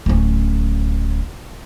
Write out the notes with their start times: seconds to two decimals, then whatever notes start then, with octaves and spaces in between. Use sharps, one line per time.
0.06 D1 C#4